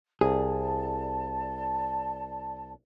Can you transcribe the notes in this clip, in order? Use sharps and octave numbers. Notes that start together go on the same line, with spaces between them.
C2 G#4 D5 A5